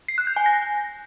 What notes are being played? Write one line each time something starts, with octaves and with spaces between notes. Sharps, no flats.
C7
F#6
G6
G#5
A#6